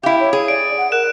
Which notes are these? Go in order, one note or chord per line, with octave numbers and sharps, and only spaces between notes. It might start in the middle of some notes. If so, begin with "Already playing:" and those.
E4 G4 F5
C#5
G#4
D5 D7
F#5
A#4 F#6 E7